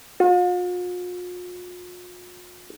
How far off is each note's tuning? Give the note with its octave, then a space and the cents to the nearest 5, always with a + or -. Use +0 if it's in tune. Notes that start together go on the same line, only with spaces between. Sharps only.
F4 +45